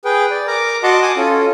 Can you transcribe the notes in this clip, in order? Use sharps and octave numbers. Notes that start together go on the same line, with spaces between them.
G#4 B4 G5
D5
A#4 A#5 D6
F#4 D#5 F#5 A5 C6 D6
G#5 D6 D#6
C#4 F4 A4